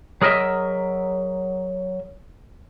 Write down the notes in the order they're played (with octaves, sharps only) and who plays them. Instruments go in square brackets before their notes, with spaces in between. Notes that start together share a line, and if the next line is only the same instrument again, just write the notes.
[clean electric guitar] F#3 G#4 A#4 D#5 E5